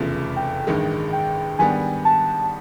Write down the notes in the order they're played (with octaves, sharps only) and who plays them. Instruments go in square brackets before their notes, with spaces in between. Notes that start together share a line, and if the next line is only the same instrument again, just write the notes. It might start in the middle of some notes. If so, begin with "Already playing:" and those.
Already playing: [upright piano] F1 E2 C#3 F3 A3
[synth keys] G5
[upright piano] A1 G2 D#3 G#3
[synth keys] G5
[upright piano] G#2 D#3 G3 B3 D4 [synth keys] G#5
[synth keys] A5